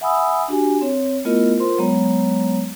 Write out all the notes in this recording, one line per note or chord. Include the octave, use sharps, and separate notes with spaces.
E5 F#5 G#5 B5 D#6 E6
D4 F#4 G4 G#5
C4 C#5
A3 B3 E4 F4 A#4 D#5
F4 A#4 C5 C6
F#3 G#3 B3 C#5 A#5